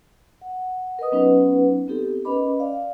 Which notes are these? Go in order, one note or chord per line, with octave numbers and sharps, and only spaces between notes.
F#5
A#4 B4 D#5 D#6
F#3 B3 C#4 D#4 B4 F#5
B3 C4 D#4 G4 A4
C#4 A#4 B4 D#5 B5 D6
D5 F5